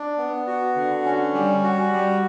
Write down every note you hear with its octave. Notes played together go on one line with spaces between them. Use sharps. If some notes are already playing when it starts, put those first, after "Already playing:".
Already playing: D4
B3
F#4
D3
C#4
G3
F#4
G3